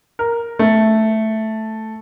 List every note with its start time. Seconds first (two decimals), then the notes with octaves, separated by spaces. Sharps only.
0.19 A#4
0.59 A3